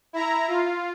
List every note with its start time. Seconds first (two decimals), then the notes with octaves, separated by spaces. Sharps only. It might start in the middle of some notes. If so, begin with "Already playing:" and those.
0.13 E4 A#5
0.48 F4